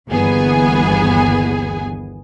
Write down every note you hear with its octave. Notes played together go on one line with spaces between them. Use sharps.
G1 D#2 E3 B3 G#4 G#5